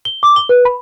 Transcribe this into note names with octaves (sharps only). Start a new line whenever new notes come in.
G7
D6
G7
B4
B5